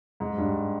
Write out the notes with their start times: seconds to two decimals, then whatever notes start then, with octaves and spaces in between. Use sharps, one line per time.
0.20 G#2
0.38 G2